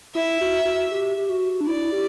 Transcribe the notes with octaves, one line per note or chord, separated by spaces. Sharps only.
E4 E5
F#4
F#4
G4
G4
F#4
D4
E4 D5
G4